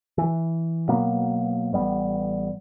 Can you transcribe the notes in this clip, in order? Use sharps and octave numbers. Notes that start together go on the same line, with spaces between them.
E3
B2 F#3 A#3 B3
A1 G3 B3